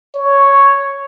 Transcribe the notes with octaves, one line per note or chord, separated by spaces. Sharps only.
C#5